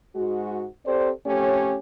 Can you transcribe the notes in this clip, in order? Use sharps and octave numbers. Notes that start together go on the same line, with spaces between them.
G#2 G#3 F#4
C4 G4 A4 C5 D5
F2 A3 C#4 G4 C#5